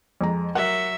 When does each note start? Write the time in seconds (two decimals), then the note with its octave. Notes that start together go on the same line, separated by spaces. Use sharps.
0.21 F2 G#3 A#5
0.55 F#3 A#4 E5 F#5